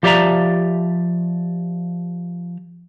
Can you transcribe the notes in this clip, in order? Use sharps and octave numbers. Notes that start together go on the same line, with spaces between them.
F3 G4 D5 E5 A#5